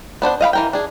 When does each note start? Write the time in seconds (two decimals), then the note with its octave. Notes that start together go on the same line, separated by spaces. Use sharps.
0.22 B3 D4 C5 F#5
0.41 D#5 F5 G5 B5
0.53 E3 A#4 G5
0.73 D4 G#4